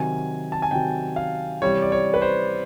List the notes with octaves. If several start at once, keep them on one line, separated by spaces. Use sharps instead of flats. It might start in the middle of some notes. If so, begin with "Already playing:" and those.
Already playing: C3 D#3 F#3 G#5
A5
G#5
C3 D#3 F#3 G5
F5
C3 E3 G3 C#5
D5
C#5
B4
C5